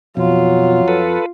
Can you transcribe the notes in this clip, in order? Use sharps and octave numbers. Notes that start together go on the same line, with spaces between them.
F2 B2 F#3 F4
A4 B4